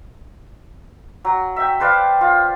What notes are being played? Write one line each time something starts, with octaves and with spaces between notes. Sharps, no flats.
F#3
E5 G5
B4 C5 D5 F5
F4